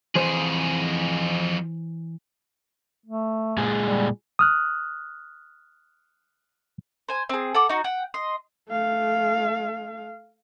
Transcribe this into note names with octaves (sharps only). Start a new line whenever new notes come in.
F2 E3 G#4 C5
A3
A#2 G#3 G#4
G3
D#6 F6 F#6
C5 G#5
C4 G#4
A4 F#5 D6
D#4 F#4
F#5 G5
D#5 C6
A3 F5